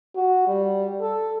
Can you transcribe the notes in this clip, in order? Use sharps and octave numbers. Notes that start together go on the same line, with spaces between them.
F#4
G3
A4